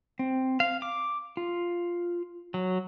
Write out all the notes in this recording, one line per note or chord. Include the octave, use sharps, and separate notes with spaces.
C4
F5
D6
F4
F#3